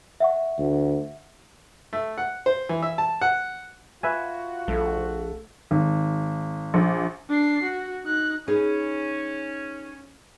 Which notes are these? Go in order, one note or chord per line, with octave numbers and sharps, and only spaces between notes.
E5 F#5 C#6
D2
A3
F#5
C5
E3
E5
A5
F#5
F4 F#4 B4 E5 G#5
A#1 A3
G#1
A#1
D4 C7
F#4
D#4 F#6
C#4 D#4 G#4 B4